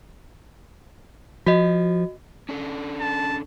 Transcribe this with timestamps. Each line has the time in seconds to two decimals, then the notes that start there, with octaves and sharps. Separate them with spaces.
1.46 F3 F#4 D#5
2.49 C#4 D4 A4
3.00 A5